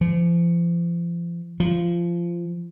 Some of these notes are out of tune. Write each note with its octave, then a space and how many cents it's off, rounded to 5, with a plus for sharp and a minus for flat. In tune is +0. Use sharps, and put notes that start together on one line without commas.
F3 -40
F3 -20